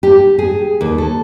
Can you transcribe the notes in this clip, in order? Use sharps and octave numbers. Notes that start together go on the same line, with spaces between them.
G4
G#4
D#2
A4